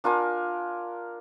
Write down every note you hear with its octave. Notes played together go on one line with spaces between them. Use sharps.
D4 F4 A#4 G#5